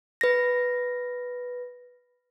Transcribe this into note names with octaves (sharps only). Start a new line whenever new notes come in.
B4 A#6